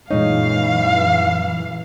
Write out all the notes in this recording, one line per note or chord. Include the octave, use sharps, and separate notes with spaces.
F#2 A#2 E3 G#3 D#4 C#5 F5